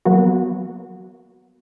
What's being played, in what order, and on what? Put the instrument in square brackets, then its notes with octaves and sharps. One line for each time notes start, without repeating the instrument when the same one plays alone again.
[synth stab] F#3 A#3 B3 F#4